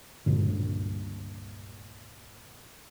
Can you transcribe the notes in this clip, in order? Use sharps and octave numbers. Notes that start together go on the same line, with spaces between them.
C#2 G2 A#2 D3